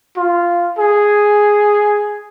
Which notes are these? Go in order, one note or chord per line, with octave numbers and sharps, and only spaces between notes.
F4
G#4